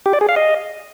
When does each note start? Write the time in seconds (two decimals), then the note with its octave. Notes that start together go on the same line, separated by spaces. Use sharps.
0.06 G4
0.13 D5
0.21 G#4
0.29 F5
0.36 D#5